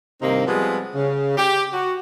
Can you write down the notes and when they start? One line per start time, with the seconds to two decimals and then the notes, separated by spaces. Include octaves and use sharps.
0.22 G2 C3 D#3 A#3 C4 D#4
0.47 F3 G3 G#3 B3 C4 B4
0.95 C#3
1.37 G4
1.73 F#4